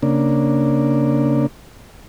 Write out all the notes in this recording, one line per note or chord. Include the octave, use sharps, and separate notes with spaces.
C#3 A#3 D4